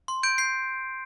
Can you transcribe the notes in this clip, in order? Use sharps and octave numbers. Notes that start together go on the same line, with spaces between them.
C6
G6 D7
G6 C7